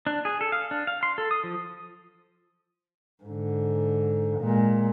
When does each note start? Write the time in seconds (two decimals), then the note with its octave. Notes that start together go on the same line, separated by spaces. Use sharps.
0.07 D4
0.25 G#4
0.41 A4
0.52 F5
0.71 D4
0.87 F5
1.03 C6
1.18 A4
1.31 D#6
1.44 F3
3.23 G#2 D3
4.38 A#2 G#3